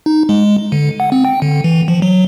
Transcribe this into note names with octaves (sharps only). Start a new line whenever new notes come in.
D#4
G#3
D3
F#5
C4
G5
D3
E3
F3
F#3